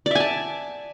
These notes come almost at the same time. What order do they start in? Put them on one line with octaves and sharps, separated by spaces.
D5 E5 G#5 A5